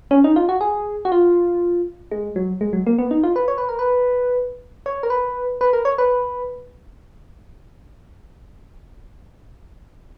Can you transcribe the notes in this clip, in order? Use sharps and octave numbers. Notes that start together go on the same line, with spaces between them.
C#4
D#4
F4
F#4
G#4
F#4
F4
G#3
F#3
G#3
F#3
A#3
B3
D#4
F4
B4
C#5
B4
A#4
B4
C#5
A#4
B4
B4
A#4
C#5
B4